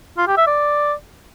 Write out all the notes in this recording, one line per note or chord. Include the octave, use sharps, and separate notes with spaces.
F4
G4
E5
D5